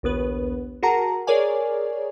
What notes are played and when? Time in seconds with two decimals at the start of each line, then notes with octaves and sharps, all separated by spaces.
0.03 A#1 D#2 B3 B4
0.83 F#4 G#4 A#4 F#5 A5 A#5
1.27 G#4 A#4 C#5 D5 G#5